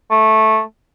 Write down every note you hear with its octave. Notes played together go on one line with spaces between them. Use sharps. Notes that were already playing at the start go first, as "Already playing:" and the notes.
A3